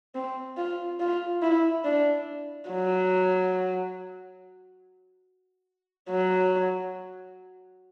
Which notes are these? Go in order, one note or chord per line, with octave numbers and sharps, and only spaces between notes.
C4
F4
F4
E4
D4
F#3
F#3